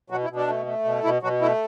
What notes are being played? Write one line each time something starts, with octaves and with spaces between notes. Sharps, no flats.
B2 F#3 F#4
E4
B2
D4
A3
A3
B2
B2 E4
B2 F#3 F#4
A3 E4